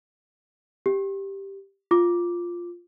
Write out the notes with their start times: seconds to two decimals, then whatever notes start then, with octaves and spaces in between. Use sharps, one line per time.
0.86 G4
1.91 F4 D6